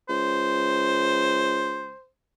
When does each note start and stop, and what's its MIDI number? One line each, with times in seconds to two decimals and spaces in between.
0.09 1.95 37
0.09 2.07 72